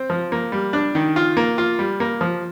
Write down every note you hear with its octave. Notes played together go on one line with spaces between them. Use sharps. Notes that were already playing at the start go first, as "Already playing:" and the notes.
Already playing: C4
F3
A#3
G3
D4
D#3
F4
A#3
F4
G3
A#3
F3